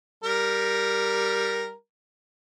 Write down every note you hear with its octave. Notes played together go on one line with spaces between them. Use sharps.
G3 A#4